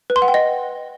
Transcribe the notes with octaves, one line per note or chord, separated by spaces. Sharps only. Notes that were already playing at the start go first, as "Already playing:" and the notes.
B4
C6
F#5
G5
D#5